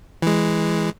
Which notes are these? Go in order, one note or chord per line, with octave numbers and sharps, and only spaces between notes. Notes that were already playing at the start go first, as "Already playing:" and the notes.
E3 G#3